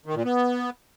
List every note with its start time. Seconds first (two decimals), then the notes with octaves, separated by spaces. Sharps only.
0.06 D#3
0.15 A#2
0.24 B3